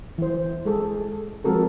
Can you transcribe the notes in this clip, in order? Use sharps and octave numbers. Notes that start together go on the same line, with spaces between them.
E3 C5
G#3 G#4 A4
F3 G#3 C4 F#4 A4 A#4